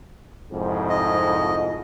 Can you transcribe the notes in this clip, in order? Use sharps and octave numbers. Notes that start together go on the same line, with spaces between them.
C2 F2 G#2
D#5